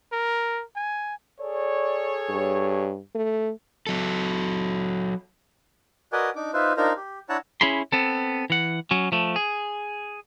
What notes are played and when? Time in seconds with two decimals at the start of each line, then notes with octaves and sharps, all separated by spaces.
0.12 A#4
0.76 G#5
1.40 G#4 A4 C#5 D5
2.29 G2
3.15 A3
3.87 F#3 A4
6.13 F#4 A#4 B4 D5 D#5 G#5
6.36 D4 D#4 D6
6.53 D#4 F4 B4 C5 E5
6.77 D4 D#4 F4 A#4 C5 A#5
6.97 G4
7.29 D4 E4 C#5 F#5 A5 A#5
7.61 C#4 E4 G#4 B5 C6
7.92 B3 C4 A4
8.50 E3 F#5
8.91 F#3 C#4
9.12 F3 A3
9.36 G#4